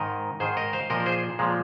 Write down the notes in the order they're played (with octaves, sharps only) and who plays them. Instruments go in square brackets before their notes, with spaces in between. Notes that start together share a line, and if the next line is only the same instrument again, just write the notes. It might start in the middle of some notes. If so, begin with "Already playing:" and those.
Already playing: [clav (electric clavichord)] G#2 D#3 A#4 D#5
G#2 D#3 G#4 C5
A#4 D#5
C5 F5
A#2 F3 A#4 D#5
A#4
G#4 C5
A#2 F3 G#3